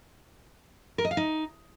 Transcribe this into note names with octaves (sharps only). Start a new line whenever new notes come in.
A#4
D#5
F5
D#4